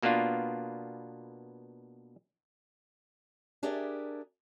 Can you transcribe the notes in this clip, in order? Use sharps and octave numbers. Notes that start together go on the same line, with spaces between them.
B2 A#3 B3 D4 F4
D4 G4 G#4 A#4 D5 E5